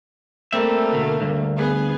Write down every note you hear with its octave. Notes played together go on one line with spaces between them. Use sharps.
G3 A3 A#3 C4 E5
D2 B2
D2 G2
B3 G#4